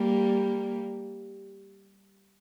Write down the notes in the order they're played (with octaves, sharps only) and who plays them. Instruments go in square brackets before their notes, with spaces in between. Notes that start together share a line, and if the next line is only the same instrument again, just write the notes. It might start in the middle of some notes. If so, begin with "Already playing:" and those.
Already playing: [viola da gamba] G3 A#3